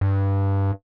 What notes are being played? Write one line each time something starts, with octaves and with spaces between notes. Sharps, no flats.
G2